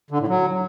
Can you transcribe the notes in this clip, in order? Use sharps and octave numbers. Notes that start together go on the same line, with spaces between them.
D3
A2
F#3